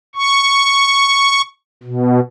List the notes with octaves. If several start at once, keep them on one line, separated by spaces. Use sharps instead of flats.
C#6
B2